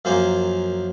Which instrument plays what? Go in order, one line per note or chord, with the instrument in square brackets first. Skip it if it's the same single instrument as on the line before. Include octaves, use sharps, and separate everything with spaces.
[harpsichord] F#2 F3 A#3 C5 G#5